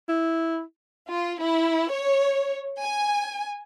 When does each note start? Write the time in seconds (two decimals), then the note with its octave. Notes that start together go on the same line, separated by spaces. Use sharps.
0.09 E4
1.10 F4
1.41 E4
1.92 C#5
2.81 G#5